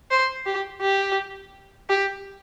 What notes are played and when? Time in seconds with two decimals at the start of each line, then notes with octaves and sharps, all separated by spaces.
0.11 C5
0.46 G4
0.81 G4
1.89 G4